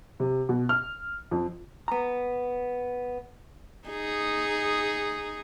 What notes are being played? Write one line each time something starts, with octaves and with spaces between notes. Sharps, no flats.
C3
B2
F6
F2
B3 A#5
D#4 G#4